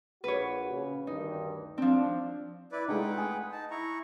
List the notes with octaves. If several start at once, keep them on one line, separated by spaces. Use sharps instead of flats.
A#1 F#4 B4 C#5
C#3
D2 G2 D#3 D#4
F3 C4 D4
E4 B4 D5
G#3 A3 D#4 B4 F#5 G5
G#5 D#6
D#4 A5
E4 A#5 C#6